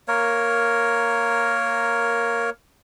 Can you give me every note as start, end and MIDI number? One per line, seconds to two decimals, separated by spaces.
0.08 2.50 58
0.08 2.50 70
0.08 2.50 73